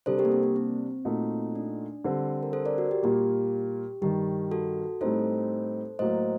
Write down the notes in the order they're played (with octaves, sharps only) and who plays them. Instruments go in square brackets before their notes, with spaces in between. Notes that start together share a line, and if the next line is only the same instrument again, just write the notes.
[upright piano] C3 G3 D4 [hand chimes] A4 C5
[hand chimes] G4 A#4
A#3
C4
A#3
C4
[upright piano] A#2 A3 D#4 F#4
[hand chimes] D4
[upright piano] D3 G3 C4
[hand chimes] A#4
A4 C5
A#4 D5
F#4
G4
[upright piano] A#2 G3 A#3 [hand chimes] G4
[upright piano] G2 D#3 G3 [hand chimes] G4
[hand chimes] F#4 A4
[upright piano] A2 G3 C4 D#4 [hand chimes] A4 C5
[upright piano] A2 F#3 A#3 [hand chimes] C5 D#5